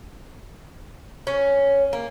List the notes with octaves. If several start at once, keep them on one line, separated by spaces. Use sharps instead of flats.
C#4
A#3